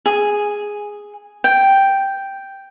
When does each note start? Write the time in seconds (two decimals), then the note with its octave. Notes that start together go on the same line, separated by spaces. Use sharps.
0.06 G#4
1.44 G5